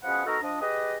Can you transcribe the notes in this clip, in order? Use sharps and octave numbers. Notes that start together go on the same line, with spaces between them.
B2 F3 C#4 G#4 B4 F#5
B3 D#4 F#4 A4 A#4 A#5
F3 D4 D#5
G4 G#4 B4 D#5